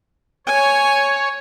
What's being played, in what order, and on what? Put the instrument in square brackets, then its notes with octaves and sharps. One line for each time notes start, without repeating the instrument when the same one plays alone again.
[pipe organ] C#5 [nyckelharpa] G#5